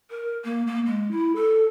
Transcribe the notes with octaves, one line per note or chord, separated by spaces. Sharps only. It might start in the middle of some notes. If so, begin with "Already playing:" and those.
A#4
A#3
A#3
G#3
E4
A4